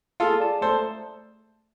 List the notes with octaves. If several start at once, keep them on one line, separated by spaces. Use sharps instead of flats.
F4 G#4 A4
D5 A5
A3 A4 C5